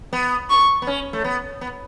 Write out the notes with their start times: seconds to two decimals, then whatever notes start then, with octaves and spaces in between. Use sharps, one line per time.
0.13 B3
0.50 C#6
0.82 B3
0.87 C#4
1.13 A3
1.24 B3
1.61 B3